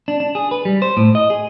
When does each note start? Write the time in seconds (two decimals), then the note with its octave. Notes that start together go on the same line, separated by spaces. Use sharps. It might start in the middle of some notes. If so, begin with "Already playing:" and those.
0.08 D4
0.20 D4
0.35 G#4
0.51 B4
0.65 G3
0.82 C5
0.97 A2
1.15 D#5
1.30 G#4